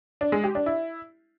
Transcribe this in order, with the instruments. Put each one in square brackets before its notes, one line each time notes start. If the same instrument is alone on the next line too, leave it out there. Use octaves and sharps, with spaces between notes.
[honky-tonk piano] D4
G#3
G4
D4
E4